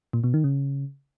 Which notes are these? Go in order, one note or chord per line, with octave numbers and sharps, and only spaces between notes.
A#2
B2
D#3
C#3